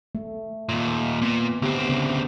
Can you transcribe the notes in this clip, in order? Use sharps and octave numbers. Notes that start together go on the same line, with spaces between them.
A3
D#2 A#2
A#2 B3
D2 A3 B3 C4 G4
C#3 B3